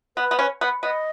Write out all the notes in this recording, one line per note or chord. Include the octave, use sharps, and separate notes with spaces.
B3 B4
B3
C#4
B3
B3 D#5